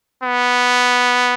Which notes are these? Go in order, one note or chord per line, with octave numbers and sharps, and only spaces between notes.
B3